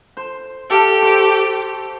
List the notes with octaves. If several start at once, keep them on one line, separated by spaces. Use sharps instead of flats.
C5
G4 A4 F5
C5 C#6